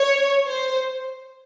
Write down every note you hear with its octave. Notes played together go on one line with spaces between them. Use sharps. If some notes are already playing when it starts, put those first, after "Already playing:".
Already playing: C#5
C5